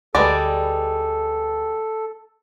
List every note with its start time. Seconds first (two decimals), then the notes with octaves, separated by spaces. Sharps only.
0.15 D2 G3 G#3 A4 B4 D5